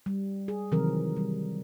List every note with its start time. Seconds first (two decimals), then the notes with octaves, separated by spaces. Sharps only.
0.06 G3
0.48 G#4
0.72 C3 D#3 E3 F#3 C4 A#4
1.17 G3